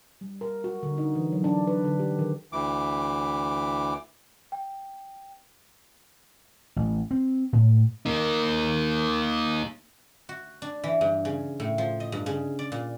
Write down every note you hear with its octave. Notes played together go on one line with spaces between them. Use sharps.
G3
A#4
F#4
D3
D#4
E3
F#3
D4
B4
D3
G4
D#3
D2 E3 D6
G5
A1
C4
A2
A#3 D#4
F#4
D4
E3
G2
C#3
A2
F3
D#5
G2
C#3
D5
A#2